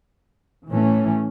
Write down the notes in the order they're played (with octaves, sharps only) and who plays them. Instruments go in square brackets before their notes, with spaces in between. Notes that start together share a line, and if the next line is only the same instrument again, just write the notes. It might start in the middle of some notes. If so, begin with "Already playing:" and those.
[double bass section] A2 E3 A3 C#4